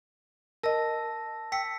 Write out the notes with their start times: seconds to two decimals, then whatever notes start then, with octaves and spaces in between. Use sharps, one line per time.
0.63 A#4 D#5 A5 E6 A#6
1.52 G5 E6 B6 C#7